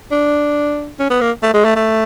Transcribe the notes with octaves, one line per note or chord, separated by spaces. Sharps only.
D4
C#4
B3
A#3
A3
G#3
A3
A3